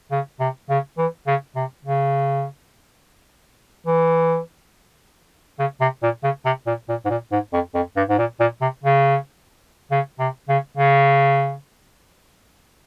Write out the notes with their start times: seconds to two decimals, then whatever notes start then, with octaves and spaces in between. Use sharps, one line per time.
0.12 C#3
0.40 C3
0.70 C#3
0.98 E3
1.27 C#3
1.56 C3
1.85 C#3
3.87 E3
5.59 C#3
5.81 C3
6.03 A#2
6.24 C#3
6.46 C3
6.67 A#2
6.89 A#2
7.05 G#2
7.10 A#2
7.32 G#2
7.53 F2
7.75 F2
7.97 G2
8.09 G#2
8.19 A#2
8.40 A#2
8.61 C3
8.84 C#3
9.92 C#3
10.19 C3
10.49 C#3
10.78 C#3